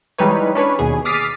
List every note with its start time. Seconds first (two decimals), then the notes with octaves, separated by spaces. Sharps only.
0.18 E3 G3 G#3 D#4 B4 C#5
0.55 C#4 D4 B4 C#5
0.79 D#2 B2 G#4
1.05 D6 D#6 F6 A6 B6 C7